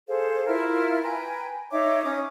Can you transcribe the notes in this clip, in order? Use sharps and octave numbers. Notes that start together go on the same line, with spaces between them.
G#4 A4 C5 F5
E4 F4 A#4 F6
B4 G5 G#5 A#5
D#4 C#5 E5 D6
C#4 D#4 D6 D#6